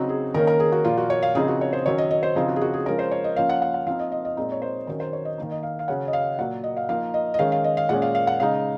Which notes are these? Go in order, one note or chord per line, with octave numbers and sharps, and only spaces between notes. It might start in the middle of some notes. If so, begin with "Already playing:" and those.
Already playing: C#3 F#3 C4 D#4 F#4
G#4
D#3 A#3 C#4 A#4
A#4
G#4
F#4
A#2 F3 A#3 F4
F#4
C#5
F5
C#3 F3 C4 D#4 G#4
F#4
C#5
C5
D#3 F#3 C#4 C#5
D#5
D#5
C5
C#3 F3 C4 D#4 G#4
F#4
G#4
F#4
G#4
F3 G#3 C#4 A#4
C5
C#5
D#5
F3 A#3 C#4 F5
F#5
F#5
F#5
F3 C4 D#4 F5
D#5
D#5
D#5
A#2 G#3 C4 D#4 D#5
C#5
C5
D#3 F#3 C#4 A#4
C5
C#5
D#5
D#3 A#3 D#4
D#5
F5
F5
C#3 F#3 C#4 F#5
D#5
F5
A#2 F#3 A#3 F#5
D#5
F5
F3 A#3 D#4 F5
D#5
D#5
D#3 G#3 C#4 F5
F5
D#5
F5
A#2 G#3 C#4 F#5
F5
F5
F#5
C#3 G#3 D#4 F5